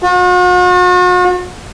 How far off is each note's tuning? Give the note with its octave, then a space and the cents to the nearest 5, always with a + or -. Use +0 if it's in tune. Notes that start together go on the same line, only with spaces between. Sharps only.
F#4 -45